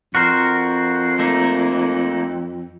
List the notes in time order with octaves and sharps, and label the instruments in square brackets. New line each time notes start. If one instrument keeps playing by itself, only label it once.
[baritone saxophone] F2 [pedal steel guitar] F#4 A#4 C5
[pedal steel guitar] A3 A#3 D#4